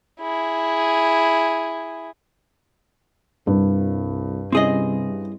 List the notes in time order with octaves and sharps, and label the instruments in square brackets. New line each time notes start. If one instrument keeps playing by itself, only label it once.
[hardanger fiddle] E4 G#4
[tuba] C2 [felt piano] G2
[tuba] C3 [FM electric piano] G3 C#4 E4 [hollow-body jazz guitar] C4 G#4 D#5